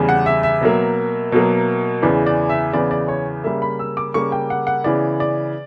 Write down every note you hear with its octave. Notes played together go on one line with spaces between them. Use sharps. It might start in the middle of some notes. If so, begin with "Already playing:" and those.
Already playing: E2 C#3 G3
F#5
E5
E5
B2 F#3 A#3
B2 F#3 A#3
E2 C#3 E3 B3 D5
D5
E5
E2 C#3 E3 B3 D5
D5
C#5
C#3 G3 A#3 E5
B5
E6
D6
C#3 G3 A#3 C#6
G5
F#5
F#5
C#3 E3 B3 D5
D5